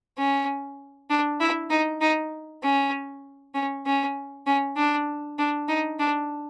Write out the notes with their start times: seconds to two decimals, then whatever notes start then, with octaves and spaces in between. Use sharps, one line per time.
0.18 C#4
1.10 D4
1.40 E4
1.71 D#4
2.01 D#4
2.63 C#4
3.55 C#4
3.86 C#4
4.47 C#4
4.77 D4
5.39 D4
5.68 D#4
6.00 D4